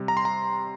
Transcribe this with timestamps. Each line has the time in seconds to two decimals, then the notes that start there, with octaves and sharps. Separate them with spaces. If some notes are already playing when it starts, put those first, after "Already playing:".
Already playing: C3 G3
0.08 A#5
0.17 C6
0.25 A#5